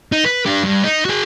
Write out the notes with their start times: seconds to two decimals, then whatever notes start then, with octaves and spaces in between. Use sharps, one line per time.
0.12 D#4
0.25 B4
0.46 D4 G4
0.63 G2
0.84 D#4
1.05 F#4 G#4